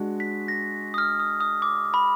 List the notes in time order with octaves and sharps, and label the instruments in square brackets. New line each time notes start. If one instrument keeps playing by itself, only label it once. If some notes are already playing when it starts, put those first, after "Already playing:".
Already playing: [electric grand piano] G#3 D4 F#4
[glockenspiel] B6
A#6
D#6
F6
D#6
D#6
D6
B5